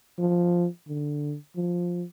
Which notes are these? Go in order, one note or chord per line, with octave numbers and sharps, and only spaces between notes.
F3
D3
F3